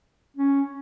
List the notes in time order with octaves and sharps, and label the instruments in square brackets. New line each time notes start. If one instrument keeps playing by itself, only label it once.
[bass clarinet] C#4